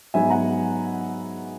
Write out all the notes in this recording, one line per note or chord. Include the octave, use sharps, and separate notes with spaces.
G#2 F#3 B3 D#4 E5 G#5
F#5 A#5